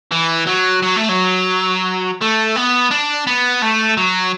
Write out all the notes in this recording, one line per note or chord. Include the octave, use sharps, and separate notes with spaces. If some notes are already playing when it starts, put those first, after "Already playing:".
E3
F#3
F#3
A3
F#3
A3
B3
D4
B3
A3
F#3